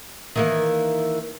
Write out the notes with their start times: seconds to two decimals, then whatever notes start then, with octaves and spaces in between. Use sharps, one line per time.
0.36 D#3 E3 A#3